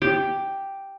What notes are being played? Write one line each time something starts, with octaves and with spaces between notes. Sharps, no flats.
G4